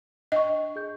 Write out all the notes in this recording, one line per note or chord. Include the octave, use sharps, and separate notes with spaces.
D4 D#5 C#6
G#4 G6